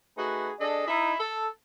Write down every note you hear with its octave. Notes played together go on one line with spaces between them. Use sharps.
A3 D#4 F#4 G#4 B4
D4 G#4 A4 D5 D#5
D#4 E4
A4